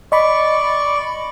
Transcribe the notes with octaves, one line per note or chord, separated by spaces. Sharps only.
D5 D#5 B5 C#6